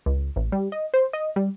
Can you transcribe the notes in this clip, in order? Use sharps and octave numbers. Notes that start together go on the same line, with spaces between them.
C#2
A1
G3
D#5
C5
D#5
G3